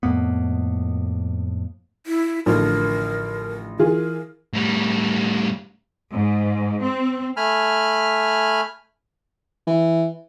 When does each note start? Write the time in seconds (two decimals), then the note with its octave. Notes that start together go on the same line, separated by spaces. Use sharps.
0.03 F2 A2 A#3 B3
2.06 E4
2.46 A1 D3 F3 A#4
3.79 E3 F4 G#4 A#4
4.54 A2 G3
6.12 G#2
6.82 C4
7.37 A3 G#5 B5 F6
9.67 E3